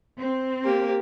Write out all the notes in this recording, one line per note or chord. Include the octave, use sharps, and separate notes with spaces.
C4
A#3 G4 A#4